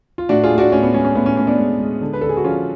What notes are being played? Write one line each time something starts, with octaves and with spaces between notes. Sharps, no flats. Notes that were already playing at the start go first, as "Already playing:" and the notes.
F4
A2 D4 F#4
F4 G#4
A2
D4 F#4
A2 C#4
B3
G#3 C#4
C#4
A2 B3
C#4
A2 C#4
B3 D4
G#3
G#3
D3
B4
D3 A4
G#4
F#4
F3 C#4 F4